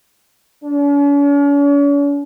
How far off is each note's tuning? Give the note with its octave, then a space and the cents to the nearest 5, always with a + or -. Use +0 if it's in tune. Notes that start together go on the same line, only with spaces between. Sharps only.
C#4 +45